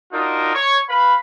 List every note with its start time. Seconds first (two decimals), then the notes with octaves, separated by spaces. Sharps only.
0.13 D4 D#4 F4 F#4 A#4
0.54 C#5 C#6
0.89 B4 F5 B5